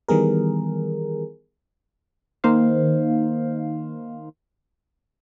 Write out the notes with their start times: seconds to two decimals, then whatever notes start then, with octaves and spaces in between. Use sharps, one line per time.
0.08 D#3 E3 G3 B3 G#4 A#4
2.44 D#3 A#3 D#4 C5 F5